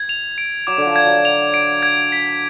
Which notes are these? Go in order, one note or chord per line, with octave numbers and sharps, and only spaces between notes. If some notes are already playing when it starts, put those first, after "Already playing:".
Already playing: G#6
F7
D7
F#3 D6
D3
F3
G#6
F#3
F7
D7
G#6
B6